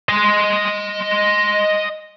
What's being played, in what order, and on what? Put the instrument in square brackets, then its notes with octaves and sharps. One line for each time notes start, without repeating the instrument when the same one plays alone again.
[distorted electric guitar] D#5 C6